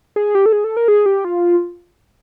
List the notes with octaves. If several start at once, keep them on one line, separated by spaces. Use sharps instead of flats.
G#4
G4
A4
G#4
A4
A#4
G#4
G4
F4